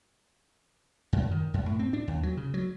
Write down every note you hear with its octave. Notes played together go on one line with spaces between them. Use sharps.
F#2
D#3
F#2
A2
C4
D4
D#2
F#3
C#3
F#3